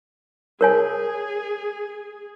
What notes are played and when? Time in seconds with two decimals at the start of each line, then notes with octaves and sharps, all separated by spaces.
0.61 G#4 A#4 C#5 G#5